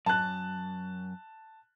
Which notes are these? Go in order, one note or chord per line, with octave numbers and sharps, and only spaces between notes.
F#2 A5 F#6